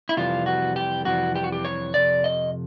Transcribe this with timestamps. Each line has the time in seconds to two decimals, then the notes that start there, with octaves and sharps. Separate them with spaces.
0.09 E4
0.17 F2 C3 E3 G3 F4
0.46 F#4
0.76 G4
1.05 F2 C3 E3 G3 F#4
1.35 G4
1.44 F#4
1.52 G4
1.65 C#5
1.94 F2 C3 D5
2.24 D#5